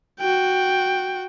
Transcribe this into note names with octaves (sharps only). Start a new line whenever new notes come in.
F#4 G5